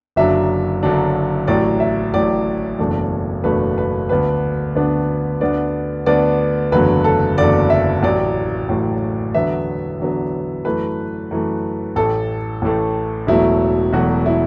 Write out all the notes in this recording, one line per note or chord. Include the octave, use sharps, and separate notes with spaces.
F#1 F#2 D3 F#3 D4 E5
F#1 F#2 D3 F#3 D4
A1 A2 F#3 D5
E5
A1 A2 F#3 D5
F#1 E2 B2 A3 D4
F#1 E2 B2 A3 D4 B4
B4
D2 D3 B3 D4 B4
D2 D3 B3 D4
D2 D3 B3 D4 D5
D2 D3 B3 D4 D5
F#1 E2 D3 F#3 A3 B4
A4
F#1 E2 D3 F#3 A3 D5
E5
A1 A2 F#3 D5
A1 A2 F#3
E2 D3 F#3 B3 E5
E2 D3 F#3 B3
F#2 E3 A3 B4
F#2 E3 A3
A1 A2 A3 A4
A1 A2 A3
E1 E2 B2 F#3 A3 E4
E1 E2 B2 F#3 A3 F#4
E4